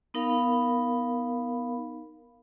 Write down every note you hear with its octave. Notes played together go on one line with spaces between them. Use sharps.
B3 D#4 A#4 F5 B5